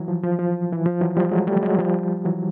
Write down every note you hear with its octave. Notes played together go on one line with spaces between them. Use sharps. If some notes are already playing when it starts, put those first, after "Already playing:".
Already playing: E3 F#3
F3
F3
F3
E3
F3
E3 F#3
F3 G3
F#3 G#3
G3 A3
F#3 G#3
F3 G3
E3 F#3